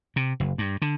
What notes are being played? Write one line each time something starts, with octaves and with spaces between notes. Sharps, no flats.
C3
F#1
G2
D3